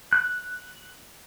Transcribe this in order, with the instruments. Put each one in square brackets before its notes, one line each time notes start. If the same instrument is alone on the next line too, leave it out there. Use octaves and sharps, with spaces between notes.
[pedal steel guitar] F#6